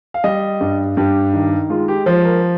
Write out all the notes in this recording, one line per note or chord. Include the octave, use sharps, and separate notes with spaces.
F5
G3 D#5
G2
G2 G4
D#3
G#3 F4
G4
F3 C5
A#4